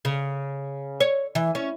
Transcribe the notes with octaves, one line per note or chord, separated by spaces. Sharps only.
C#3
C#5
E3
C#4